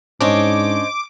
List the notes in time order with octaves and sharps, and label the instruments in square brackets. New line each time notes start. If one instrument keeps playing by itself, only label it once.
[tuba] G#2 [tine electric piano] C#4 D4 [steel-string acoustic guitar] C5 C#5 D#5 [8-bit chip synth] D6